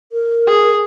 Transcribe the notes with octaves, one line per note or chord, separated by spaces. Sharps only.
A#4
G#4